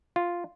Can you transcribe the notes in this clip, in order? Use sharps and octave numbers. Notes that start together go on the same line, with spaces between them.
F4